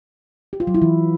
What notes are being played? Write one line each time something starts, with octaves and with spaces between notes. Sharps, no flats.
G4
F4
F#3
E4
E3